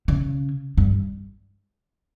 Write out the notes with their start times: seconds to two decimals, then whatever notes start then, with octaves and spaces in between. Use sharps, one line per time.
0.08 C#3
0.78 G2